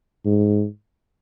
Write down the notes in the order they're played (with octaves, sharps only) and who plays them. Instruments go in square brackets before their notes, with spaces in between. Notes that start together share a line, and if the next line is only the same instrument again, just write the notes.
[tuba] G#2